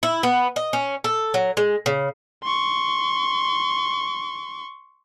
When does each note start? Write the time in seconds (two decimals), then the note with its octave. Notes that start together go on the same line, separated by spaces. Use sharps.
0.03 E4
0.23 B3
0.56 D#5
0.73 C#4
1.04 A4
1.34 F#3
1.57 G#3
1.86 C#3
2.44 C6 C#6